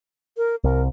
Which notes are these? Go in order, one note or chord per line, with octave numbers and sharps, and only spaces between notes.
A#4
C2 A#4